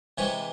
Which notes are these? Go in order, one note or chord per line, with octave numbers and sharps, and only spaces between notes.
C3 E3 G#3 C#5